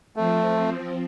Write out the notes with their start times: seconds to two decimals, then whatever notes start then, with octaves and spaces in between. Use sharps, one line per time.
0.16 F3 A3 C4